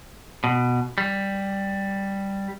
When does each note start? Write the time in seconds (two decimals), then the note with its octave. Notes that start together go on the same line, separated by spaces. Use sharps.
0.44 B2
0.98 G3